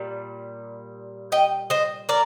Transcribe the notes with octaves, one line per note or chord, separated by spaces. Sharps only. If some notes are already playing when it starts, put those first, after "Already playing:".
Already playing: A#2 G3
D#5 G5
C5 D#5
A#4 D5